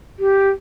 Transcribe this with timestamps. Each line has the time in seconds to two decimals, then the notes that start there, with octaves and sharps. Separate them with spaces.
0.19 G4